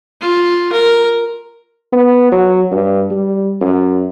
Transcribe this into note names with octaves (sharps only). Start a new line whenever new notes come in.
F4
A#4
B3
F#3
G2
G3
F#2